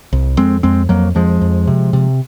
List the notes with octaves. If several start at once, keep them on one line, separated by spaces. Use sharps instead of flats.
C2
F2 G#3 C4
F2 G#3 C4
F2 F#3 A#3
F2 F3 G#3
F2
C3
C3